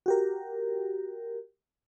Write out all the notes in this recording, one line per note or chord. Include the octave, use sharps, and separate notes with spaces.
F#4 G4 A#4